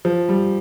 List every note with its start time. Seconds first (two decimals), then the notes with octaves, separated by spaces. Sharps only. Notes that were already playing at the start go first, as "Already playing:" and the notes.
0.05 F3
0.29 G3